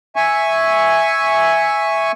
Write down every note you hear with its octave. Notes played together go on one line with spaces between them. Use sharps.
E5 G#5 C#6